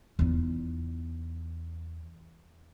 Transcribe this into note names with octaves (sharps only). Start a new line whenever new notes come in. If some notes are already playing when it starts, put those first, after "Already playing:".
E2 D#4